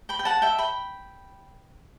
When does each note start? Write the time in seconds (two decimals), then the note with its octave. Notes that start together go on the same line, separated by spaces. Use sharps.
0.09 G5 B5
0.19 G5
0.25 F#5 A5
0.42 E5 G5
0.58 G5 B5